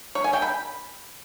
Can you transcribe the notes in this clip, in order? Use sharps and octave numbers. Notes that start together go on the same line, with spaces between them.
C#5
G#5
G5
B5